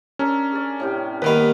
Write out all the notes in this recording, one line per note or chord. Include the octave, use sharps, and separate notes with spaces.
C#4 D4 A4 A#4
G#4 D5
A2 C3 G5
D#2 D#3 G3 B3 B4 F5 B5